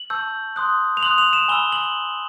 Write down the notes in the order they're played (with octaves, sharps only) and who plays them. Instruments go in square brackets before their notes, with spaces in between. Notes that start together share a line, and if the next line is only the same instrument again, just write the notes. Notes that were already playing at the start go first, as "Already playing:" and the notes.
Already playing: [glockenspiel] F#7
A5 C#6 E6 G6
C6 D#6 F#6
F7
C6 D#6 F#6 F#7
F7
E7
G#5 B5 E6 G7
F#7